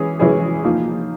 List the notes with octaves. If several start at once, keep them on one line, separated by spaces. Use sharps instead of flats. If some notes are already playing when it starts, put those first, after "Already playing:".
Already playing: E3 G#3 C#4 E4 G#4
E3 G#3 C#4 E4 G#4
F3 A#3 D#4